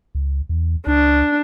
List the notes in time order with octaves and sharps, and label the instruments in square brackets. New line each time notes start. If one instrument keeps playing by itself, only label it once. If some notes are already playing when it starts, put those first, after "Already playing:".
[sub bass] C#2
E2
[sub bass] C#2 [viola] D4